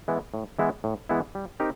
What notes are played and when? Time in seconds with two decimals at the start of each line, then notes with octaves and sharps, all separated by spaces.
0.08 E3 G#3 B3 E4
0.34 A2
0.59 E3 G#3 B3 E4
0.84 A2
1.09 E3 G#3 B3 E4
1.35 G3
1.60 C4 D#4 G4 A#4